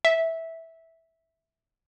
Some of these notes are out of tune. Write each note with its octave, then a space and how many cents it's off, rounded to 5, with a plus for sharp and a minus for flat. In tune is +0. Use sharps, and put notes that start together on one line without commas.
E5 -10